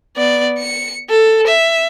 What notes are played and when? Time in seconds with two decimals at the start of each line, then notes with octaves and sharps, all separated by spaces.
0.17 B3 D5
0.59 C#7
1.10 A4
1.47 E5